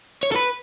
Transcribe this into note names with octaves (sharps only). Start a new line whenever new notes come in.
C#5
A4
B4